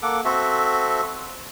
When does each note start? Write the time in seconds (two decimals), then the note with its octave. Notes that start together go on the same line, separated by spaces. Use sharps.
0.02 A#3 A4 F#5 D6
0.25 C4 F#4 A4 E5